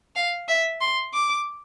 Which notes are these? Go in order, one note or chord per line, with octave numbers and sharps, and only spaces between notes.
F5
E5
C6
D6